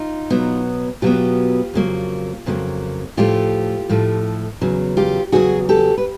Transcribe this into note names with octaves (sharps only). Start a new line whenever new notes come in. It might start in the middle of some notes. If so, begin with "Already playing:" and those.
Already playing: D#4 F4
B2 F#3 B3
B2 F#3 B3 F4 G4
F2 C#3 F#3 A#3
F2 C#3 F#3 A#3
A2 F3 A3 F4 G4
A2 F3 A3
E2 C#3 F#3
F4 G4
E2 C#3 F#3 F#4 G#4
G4 A4
B4